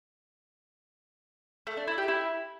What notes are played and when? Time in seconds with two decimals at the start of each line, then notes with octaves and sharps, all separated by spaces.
1.67 A3
1.77 D4
1.87 E4
1.98 G4
2.08 E4